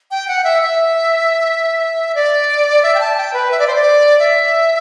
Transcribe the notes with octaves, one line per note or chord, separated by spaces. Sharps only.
G5
F#5
E5
E5
D5
E5
G5
A5
G5
B4
E5
D5
C5
D5
E5